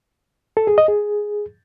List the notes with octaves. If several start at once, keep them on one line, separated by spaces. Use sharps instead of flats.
A4
G#4
D#5
G#4